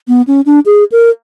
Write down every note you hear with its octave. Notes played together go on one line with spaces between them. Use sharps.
B3
C#4
D4
G#4
A#4